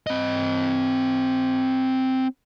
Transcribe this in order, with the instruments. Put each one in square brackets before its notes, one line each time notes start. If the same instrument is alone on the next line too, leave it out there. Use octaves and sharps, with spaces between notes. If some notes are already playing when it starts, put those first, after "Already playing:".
[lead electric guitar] C4 D#5